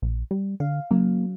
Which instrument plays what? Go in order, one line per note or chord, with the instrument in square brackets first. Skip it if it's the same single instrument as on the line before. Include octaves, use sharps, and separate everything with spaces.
[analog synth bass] A#1
G3
[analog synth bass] D3 [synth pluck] F5
[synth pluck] C#3 F#3 [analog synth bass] A#3